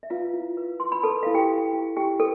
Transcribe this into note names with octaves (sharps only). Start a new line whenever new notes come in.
E5
F4 B4 F5
E4
B4
B4 C6
B5
A4 B4 A5
E4 F5
G4 G5
E4
E4
E4 G4 G5
A4 B4